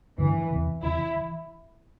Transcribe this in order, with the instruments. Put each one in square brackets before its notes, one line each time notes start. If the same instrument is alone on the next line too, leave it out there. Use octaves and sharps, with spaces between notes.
[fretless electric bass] G2 D3 A3 D4 [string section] E3
[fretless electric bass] E2 C3 E3
[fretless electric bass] E2 C3 E3 [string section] E4
[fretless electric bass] E3